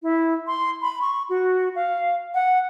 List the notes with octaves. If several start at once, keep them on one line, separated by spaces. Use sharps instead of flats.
E4
C6
B5
C#6
F#4
F5
F#5